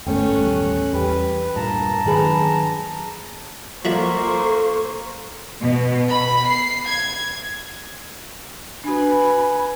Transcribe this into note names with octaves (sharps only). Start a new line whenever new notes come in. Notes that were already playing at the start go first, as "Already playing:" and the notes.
G1 G2 A3 B3 C#4 G5
A1 D#2 G3 F#6
E2 G3 G4 B4
G2 A#2 A#3 A5 A#5
D#3 F#3 A#3 D4 G#4 B4
F3 A#3 F#4 A4 C5 E5 C#6
B2
B5
C7
G#6
D4 F#4 B4 G#5 B5